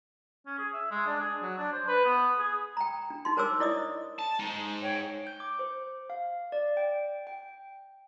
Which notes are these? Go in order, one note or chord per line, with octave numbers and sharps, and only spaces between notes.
C#4
G#4
E5
G#3
D4
G#4
F#3
D4
C5
B4
B3
G#4
G5 A#5
D4
D#4 C6
A#4 C5 C#5 G#5 D6 E6
E4 D5 D#5 D#6
A5
G#3 D#4
C#5 G5
G6
D6
C5
F5
D5
G5
G5